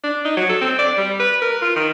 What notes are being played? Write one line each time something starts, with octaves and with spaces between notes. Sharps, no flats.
D4
D#4
F#3
A4
C4
D5
G3
B4
A#4
F4
D#3